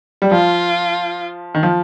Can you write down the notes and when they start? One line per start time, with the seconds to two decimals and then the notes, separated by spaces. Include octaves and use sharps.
0.22 G3
0.31 F3 F4
1.55 D#3
1.63 F3